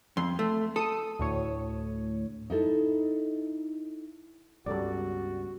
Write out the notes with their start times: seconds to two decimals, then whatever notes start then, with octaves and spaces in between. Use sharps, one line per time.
0.17 F2 C6
0.39 A3
0.76 A4 D#6
1.19 D2 A2 C#5
2.50 D#4 E4 A4
4.66 C#2 G2 G3 B3 F#4 A4 D5